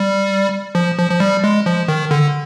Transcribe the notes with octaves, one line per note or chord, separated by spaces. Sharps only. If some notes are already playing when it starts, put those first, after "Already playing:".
Already playing: G3
F3
F3
F3
G3
G#3
F3
D#3
D3